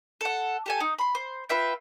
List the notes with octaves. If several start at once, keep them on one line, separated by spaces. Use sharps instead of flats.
A4 F#5
G4 A4 G#5
D#4
B5 C6
C5
F4 B4 E5 G5